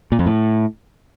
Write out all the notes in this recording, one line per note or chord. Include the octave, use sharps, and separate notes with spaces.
A#2
F2
A2